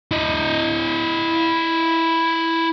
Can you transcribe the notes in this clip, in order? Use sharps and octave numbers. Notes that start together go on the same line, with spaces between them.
E4 D#5